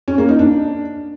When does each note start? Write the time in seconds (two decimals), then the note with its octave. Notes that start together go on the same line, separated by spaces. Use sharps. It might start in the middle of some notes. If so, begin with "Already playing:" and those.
0.08 C#4
0.18 A#3
0.29 D#4
0.39 D4